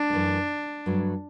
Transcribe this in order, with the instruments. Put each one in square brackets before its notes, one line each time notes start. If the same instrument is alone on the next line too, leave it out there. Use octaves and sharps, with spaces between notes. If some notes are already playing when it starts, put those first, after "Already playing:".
Already playing: [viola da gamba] D4
[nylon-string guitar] F#2 E3 A3
G2 F#3 A3